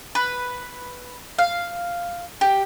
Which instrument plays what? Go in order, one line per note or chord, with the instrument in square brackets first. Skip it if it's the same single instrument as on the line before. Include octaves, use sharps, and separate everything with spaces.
[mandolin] B4
F5
G4